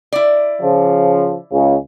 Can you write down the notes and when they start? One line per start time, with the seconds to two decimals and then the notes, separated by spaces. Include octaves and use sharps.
0.13 E4 D5
0.62 C#3 F3
1.52 C#2 C#3